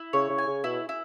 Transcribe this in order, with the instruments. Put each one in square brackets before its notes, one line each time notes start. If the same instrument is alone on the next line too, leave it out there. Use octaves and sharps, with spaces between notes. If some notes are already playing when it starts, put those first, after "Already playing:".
Already playing: [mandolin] E4
[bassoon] C#3 [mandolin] C#5
[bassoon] C#3
[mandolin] G#5
[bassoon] C#3
[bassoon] B2 [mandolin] E4
[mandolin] E4